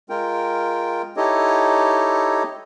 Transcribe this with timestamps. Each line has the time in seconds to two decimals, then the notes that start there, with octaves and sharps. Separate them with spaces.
0.10 G#3 F4 A#4 G5
1.17 D#4 E4 G4 A4 C#5 D#5